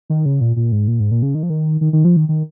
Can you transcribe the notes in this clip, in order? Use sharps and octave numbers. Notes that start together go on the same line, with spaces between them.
D#3
C#3
A#2
A#2
G#2
A#2
G#2
A#2
C#3
D#3
F3
D#3
D#3
D#3
F3
D#3
D#3